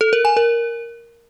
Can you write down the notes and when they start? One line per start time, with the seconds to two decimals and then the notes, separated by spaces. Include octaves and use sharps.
0.01 A4
0.13 A#4
0.25 G#5
0.37 A#4